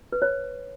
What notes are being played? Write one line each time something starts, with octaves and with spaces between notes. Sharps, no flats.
B4
C#5